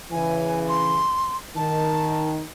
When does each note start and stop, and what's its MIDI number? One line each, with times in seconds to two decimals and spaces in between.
0.12 1.02 49
0.12 1.02 52
0.12 0.60 80
0.68 1.37 84
1.56 2.43 51
1.56 2.30 81